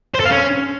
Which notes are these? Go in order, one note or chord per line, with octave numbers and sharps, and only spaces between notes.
C5
A4
F5
C#4